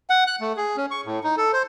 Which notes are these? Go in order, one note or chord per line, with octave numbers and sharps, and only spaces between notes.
F#5
F#6
A3
G#4
C#4
C#6
A2
D#4
A4
C5